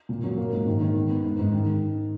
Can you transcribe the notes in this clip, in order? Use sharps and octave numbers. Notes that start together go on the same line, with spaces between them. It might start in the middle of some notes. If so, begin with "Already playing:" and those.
A#2
F#3
A#3
G#2
D#3
D#3
B3
B3
G#2
G#2
D#3